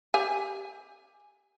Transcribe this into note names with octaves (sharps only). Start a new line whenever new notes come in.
G4 G#5